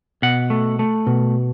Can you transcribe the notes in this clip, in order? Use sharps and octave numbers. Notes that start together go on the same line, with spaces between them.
B2 F#5
A3
A3
B2